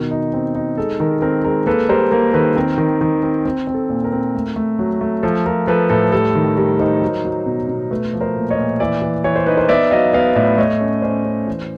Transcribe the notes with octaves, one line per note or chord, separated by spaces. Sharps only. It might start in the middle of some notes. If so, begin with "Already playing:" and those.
Already playing: B2 D#3 A#4
D#4
C4
D#4
G#3 A4
D#3 A#4
C4 A#4
G#3 A#4
A#3 A4 B4
G3 A#4 C5
A#3 A#4
D#3 A4 B4
C4 A#4
D#3
D#3
C4
C4
C4
A4
A#2
A#4
C4
A3
A3
F#3
A3
F3 A4
F3 A#4
F3 A4 B4
A2 A4 B4
G3 A4
D#3
G3 A#4
D#4 A#4 C5
F#3
F#3
B2
B2
A3 A4 B4
F3
A#4 C5
A#2
C#5 D#5
A#2
E3 D5 E5
E3
E3 C#5
C5
D#4 B4
A#4 C5
B3 D5 E5
F#3 D#5 F5
B3 D#5 F5
A2 D5 E5
A3 C#5 D#5
C#4
C#4 C5 D5
C#4
E3